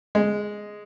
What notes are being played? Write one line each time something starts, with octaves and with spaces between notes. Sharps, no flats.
G#3